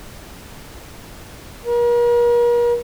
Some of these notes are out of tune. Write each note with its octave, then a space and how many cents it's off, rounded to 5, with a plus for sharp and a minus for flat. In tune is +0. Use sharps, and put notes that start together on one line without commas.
A#4 +40